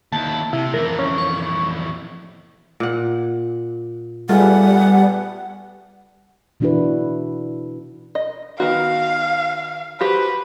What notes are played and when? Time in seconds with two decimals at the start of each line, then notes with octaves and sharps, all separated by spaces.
0.13 D#2 E4 A5
0.53 C3 E4
0.74 F2 E3 A#4
0.99 C#4
1.18 C#6
2.80 A#2 F#5
4.29 G3 A3 B3 F4 G#4 F#5
6.60 B2 E3 D4 E4 F#4 B4
8.15 D#5
8.60 D#3 B3 F#4 F5
10.01 F#4 G4 B4 C5